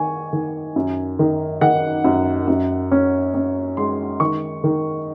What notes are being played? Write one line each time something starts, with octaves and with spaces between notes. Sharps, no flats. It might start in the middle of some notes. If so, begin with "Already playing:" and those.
Already playing: D#3 G#5 C#6
D#3
F#2
D#3
D#3 F#5
F#2
F#2
C#4
C#4
G#3 C6
D#3 C#6
D#3